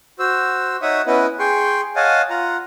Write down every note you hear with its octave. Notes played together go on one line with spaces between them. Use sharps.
F#4 C5 E6
D#4 C#5 E5 F#5 C#6 D#6
B3 C#4 E4 B4 D#5 F#5
G#4 G5 C6 C#6
C#5 D#5 F5 F#5 G#5 A5
F4 F#5 A#5